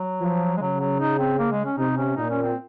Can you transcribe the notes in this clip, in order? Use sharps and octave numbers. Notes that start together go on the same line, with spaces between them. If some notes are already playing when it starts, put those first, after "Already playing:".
Already playing: F#3
F3
G#3
C#3 F#3
F#3
D#4
C4
A#3
G#3
C#4
C3 D#4
C#4
A#2 D#4
C#4
C4